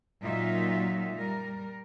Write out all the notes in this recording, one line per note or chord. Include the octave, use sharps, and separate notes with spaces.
A#2 F#3 D#4 F4 E5
G3 A#4